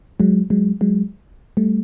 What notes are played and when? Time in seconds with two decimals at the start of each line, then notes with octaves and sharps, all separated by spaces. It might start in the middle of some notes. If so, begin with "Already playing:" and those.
0.20 F#3 G#3
0.50 F#3 G#3
0.81 F#3 G#3
1.57 G3 A3